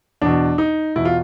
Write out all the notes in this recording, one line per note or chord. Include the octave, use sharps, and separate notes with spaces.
E2 B2 D4
D#4
E2 B2 E4
F4